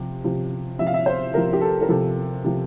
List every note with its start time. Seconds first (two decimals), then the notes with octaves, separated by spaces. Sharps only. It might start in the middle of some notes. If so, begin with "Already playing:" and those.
Already playing: C3 F3
0.24 C3 F3
0.79 C3 F3 E5
0.87 F5
0.94 E5
1.06 C5
1.34 C3 F3 A#4
1.53 G4
1.61 A4
1.81 A#4
1.89 C3 F3 A4
2.44 C3 F3